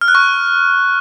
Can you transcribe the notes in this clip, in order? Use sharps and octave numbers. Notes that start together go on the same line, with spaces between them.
F6
F#6
C#6